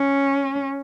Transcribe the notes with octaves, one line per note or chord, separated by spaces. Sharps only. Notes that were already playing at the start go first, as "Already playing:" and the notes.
Already playing: C#4